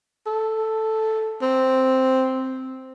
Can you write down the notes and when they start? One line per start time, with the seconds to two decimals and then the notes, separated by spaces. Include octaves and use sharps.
0.26 A4
1.42 C4